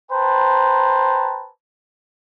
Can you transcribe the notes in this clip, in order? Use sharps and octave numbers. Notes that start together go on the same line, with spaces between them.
B4 C5 G5 A5 A#5